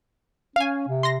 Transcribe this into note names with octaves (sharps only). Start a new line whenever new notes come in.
C#4 F5 G#5
C3
C6 A#6